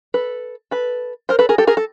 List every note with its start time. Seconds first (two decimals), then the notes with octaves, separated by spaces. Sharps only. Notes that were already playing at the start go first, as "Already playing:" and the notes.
0.14 A4 B4
0.71 A4 B4
1.29 A#4 C5
1.39 A4 B4
1.49 G#4 A#4
1.58 G4 A4
1.67 G#4 A#4
1.77 A4